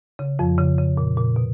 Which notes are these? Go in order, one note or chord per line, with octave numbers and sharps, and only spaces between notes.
C#3
F2 F3
C#3
C#3
A#2
A#2
B2